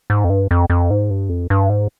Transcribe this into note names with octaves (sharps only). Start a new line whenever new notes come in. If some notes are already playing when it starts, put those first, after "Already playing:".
G#2
F2
G2
F2
F2
G#2
G2
F2
G2
G#2